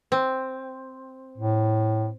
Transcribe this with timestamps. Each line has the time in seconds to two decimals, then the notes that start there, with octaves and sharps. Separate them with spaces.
0.12 C4
1.38 A2